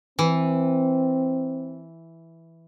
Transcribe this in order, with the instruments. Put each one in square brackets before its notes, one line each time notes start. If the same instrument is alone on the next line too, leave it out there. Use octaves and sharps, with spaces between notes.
[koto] E3 [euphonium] C4